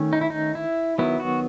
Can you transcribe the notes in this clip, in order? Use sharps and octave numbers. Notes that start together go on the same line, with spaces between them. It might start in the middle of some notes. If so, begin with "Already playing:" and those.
Already playing: D#3 A3 C#4
D#4
E4
D#4
E4
D#3 F#3 B3 E4
F#4